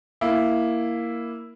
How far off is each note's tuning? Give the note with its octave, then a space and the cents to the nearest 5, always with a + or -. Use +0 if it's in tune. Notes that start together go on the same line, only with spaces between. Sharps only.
A#3 +0 E4 +0